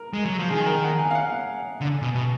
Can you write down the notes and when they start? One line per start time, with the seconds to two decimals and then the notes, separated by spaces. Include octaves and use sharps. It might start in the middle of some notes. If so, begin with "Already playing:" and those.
Already playing: A#4
0.14 G#3
0.25 F#3
0.38 F3
0.50 D#3 G#4
0.66 A#4
0.84 F#5
0.99 G#5
1.11 F5
1.15 F#5
1.81 D3
2.02 B2
2.15 B2